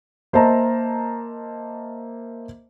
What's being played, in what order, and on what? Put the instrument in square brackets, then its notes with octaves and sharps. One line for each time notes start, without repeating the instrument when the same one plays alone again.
[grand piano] A#3 C5 D#5 E5 A5 A#5